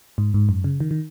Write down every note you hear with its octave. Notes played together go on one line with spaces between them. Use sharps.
G#2
G#2
F#2
C#3
D#3
D#3